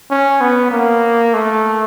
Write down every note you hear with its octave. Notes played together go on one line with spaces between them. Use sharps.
C#4
B3
A#3
A3